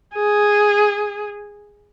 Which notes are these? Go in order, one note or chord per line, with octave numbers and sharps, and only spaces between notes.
G#4